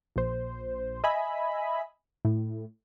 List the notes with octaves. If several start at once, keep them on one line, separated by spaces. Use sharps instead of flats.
A#1 C5
D#5 E5 G#5 B5
A2